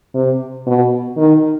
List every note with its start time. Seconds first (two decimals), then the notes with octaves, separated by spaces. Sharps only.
0.14 C3
0.67 B2
1.17 D#3